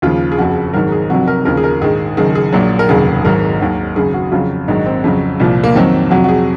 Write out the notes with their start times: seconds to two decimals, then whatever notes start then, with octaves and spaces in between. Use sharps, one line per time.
0.02 D#2 C#3 F3 F4
0.32 G#4
0.38 F#1 F2 C#3 F#4
0.73 G#1 G#2 D#3 F#3 A#4
0.92 G#4
1.10 F1 F2 C3 F#3 F#4
1.27 A#4
1.45 D#2 C#3 F3 A#4
1.57 G#4
1.64 A#4
1.81 A#1 G#2 D#3 G#4
2.17 F#1 F#2 D#3 G#4
2.35 G#4
2.53 A#1 A#2 F#3
2.79 A#4
2.89 F1 D#2 C#3 F#3 G#4
3.24 G#1 G#2 F#3 A#4
3.61 D#2 D#3 F#3
3.96 G#1 F#2 C#3 G#4
4.14 F#4
4.32 F2 C#3 F#3 F4
4.68 A#1 G#2 D#3 F#3 D#4
4.86 C4
5.04 F2 C#3 F#3
5.40 C2 A#2 F3
5.64 A#3
5.75 F2 D#3 F#3 C4
6.10 F2 C3 F#3 F#4
6.24 F#4
6.29 G#4